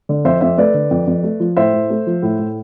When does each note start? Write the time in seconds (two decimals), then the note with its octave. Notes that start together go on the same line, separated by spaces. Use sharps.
0.09 D3
0.25 F2 C5 E5
0.41 F2 C5 E5
0.58 A3 B4 D5
0.74 D3
0.91 F2
1.07 F2
1.23 A3
1.40 F3
1.57 A2 C5 E5
1.74 A2
1.90 A3
2.07 F3
2.23 A2
2.39 A2